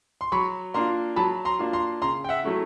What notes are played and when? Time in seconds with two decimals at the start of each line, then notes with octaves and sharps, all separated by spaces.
0.21 C6
0.32 F#3 B5 C#6
0.74 A#3 D4 F4 A#5 C6
1.16 F#3 A5 B5
1.45 A#5 C6
1.59 A#3 D4 F4
1.73 A#5 C6
2.02 C#3 A#5 C6
2.24 G5
2.29 E5 F#5
2.44 F#3 A3 C#4 E4